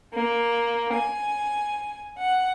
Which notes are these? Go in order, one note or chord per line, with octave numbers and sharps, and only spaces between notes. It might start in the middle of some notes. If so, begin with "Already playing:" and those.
A#3
G#5
F#5